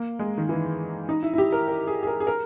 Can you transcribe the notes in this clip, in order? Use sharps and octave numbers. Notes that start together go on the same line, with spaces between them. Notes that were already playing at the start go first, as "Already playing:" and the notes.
Already playing: A#3
G#3
D#3
E3
D#4
E4
E4
G4
A#4
A#4
G#4
G#4
A#4
G#4
A#4